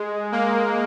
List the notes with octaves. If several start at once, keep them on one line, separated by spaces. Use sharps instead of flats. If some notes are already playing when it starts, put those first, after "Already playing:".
Already playing: G#3
A#3